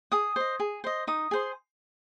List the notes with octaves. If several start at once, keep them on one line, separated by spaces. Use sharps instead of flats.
G#4 D#6
C5 D#5
G#4
C5 D#5
D#4 D#6
G#4 C5